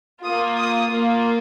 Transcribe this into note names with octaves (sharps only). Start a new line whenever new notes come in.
A#3 F4 D#6
D#6
A#3 F4